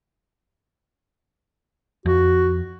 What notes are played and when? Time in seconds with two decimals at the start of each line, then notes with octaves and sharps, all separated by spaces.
2.06 F2 F#4